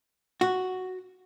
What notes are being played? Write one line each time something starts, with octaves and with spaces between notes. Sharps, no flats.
F#4